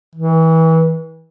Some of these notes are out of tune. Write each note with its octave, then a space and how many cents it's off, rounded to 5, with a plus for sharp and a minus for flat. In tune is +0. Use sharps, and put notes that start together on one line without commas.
E3 -30